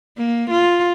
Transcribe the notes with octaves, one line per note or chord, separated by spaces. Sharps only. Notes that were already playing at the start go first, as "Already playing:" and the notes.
A#3
F4